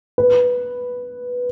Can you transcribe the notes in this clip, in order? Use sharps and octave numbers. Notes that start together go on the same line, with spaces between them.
B4